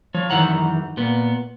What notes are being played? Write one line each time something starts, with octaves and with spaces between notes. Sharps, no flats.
F3 C#5
F#2 D#3 E3 F#5 A#5
A#2 B3